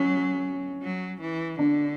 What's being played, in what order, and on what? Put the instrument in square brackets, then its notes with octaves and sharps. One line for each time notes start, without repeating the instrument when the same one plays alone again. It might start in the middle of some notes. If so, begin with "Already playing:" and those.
Already playing: [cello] F#3 [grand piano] C#4
[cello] F#3
E3
[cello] D3 [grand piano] D4